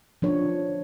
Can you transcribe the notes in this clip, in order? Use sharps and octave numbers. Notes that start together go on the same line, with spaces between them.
F3 D4 C#5